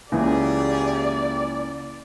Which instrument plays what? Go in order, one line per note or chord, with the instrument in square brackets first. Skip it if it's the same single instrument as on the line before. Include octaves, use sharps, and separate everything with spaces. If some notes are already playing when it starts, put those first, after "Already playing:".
[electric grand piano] C#2 E3 [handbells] A#3 C#4 [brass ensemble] G4 G#4 [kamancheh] D5